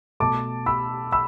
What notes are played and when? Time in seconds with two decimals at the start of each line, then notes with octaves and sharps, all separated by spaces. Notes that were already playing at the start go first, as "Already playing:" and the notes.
0.20 B2 A3 A5 D6
0.66 B5 E6
1.12 B5 E6